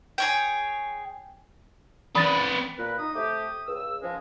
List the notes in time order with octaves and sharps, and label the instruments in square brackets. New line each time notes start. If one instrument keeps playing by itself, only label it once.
[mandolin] G#4 C#5 G5
[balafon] E3 C#4 [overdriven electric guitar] C4 B4 [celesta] B5 A6
[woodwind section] A#2 B4 [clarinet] A#4
[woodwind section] D#4 [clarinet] D#6
[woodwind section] C3 A3 G4
C#2 E6
[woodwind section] G#2 F3 G#3 [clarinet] C#4